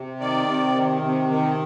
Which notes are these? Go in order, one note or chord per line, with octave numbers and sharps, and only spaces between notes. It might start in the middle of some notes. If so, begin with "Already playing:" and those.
Already playing: C3
D#3 D5
C3
D#3
C3
D#3